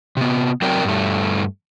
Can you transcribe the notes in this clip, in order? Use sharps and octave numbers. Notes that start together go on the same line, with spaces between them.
C3 B3
F#3 C4 A#4 D5 G5
G2 A3